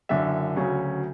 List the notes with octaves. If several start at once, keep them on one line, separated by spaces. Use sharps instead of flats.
F#1 F#2 D3 E5
D2 C#3 F#3 C#4